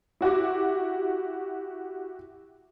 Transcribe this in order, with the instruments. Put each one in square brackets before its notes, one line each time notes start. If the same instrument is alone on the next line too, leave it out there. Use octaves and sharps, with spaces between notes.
[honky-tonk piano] E4 F#4 G4 D6